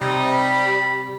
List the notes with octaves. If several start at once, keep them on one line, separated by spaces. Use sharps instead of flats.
C3 G3 D#4
B5